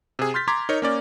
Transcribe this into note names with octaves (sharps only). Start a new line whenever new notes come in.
C3 G#4
C6 F6 G6 A6 B6
A#5 C6 D6 G#6 B6
D#4 A#4 C#5
A#3 C#4 D5